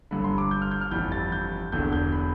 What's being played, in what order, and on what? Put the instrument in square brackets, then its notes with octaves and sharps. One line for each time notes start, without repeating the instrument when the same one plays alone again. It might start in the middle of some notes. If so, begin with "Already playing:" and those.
[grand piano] G1 G2 D3 B5
C6
D6
G6
F6
G6
F6
G1 F2 E3 G3 G6
A6
G6
E1 E2 D3 G6
G6
B5